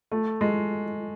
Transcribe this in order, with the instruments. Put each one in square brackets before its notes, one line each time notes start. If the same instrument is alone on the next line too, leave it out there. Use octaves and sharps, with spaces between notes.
[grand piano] A3
G#3